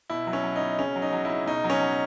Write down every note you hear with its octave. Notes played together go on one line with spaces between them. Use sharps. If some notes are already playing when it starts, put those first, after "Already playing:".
B2 E4
F#3
C#4
F#3
D#4
B2
C#3 C#4
F#3
D#4
F#3
C#3 E4
B2 D#4
F#3
C#4
F#3